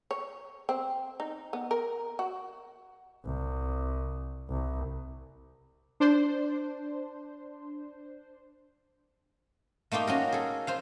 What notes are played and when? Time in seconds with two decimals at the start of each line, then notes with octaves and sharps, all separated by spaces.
0.11 C#5
0.69 C4
1.20 D#4
1.53 B3
1.71 A#4
2.19 F#4
3.25 C2
4.50 C2
6.00 D4 C5
9.91 A3 A#3 D#4 F4 G4
10.07 C#4 F#4 A#4
10.32 G#4 A4
10.67 F4 C5 F5